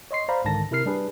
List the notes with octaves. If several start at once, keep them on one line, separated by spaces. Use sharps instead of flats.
C#5 D#5 C6 C7
C5 D5 F5 A#5 B5
C2 G#2 D3 D#3 A5 A#6
C3 E4 A#4 F6 C7
G3 D4 G#4 B4